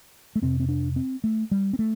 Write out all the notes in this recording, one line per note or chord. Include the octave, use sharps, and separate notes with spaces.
A3
F2 C3 C4
C4
D4
C4
A3
G3
C4
A3